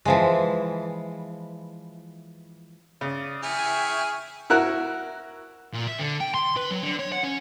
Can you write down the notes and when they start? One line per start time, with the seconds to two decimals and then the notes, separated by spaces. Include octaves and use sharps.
0.05 E3 F3 G#3
3.01 C#3 D5 D#6
3.43 E4 G#4 E5 G5 G#5 C#6 F6
4.50 E4 F#4 A#4 F#6
5.73 A#2
5.87 E5
5.99 D3
6.20 G5
6.34 C6
6.57 B4
6.71 F#3
6.83 D3
6.99 C#5
7.12 F#5
7.24 C#4